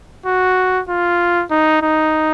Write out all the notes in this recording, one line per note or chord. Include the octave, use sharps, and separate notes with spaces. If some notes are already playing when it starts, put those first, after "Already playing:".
F#4
F4
D#4
D#4